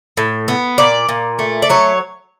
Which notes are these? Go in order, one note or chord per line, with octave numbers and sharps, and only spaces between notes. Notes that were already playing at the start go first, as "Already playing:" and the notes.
A2
B3
A#2 D5
A#2
A3
D5
F#3 C#5